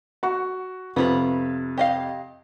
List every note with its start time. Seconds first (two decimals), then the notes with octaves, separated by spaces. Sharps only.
0.23 F#4 C#6
0.96 F2 C3 B3 F4 B4
1.78 G4 D#5 F5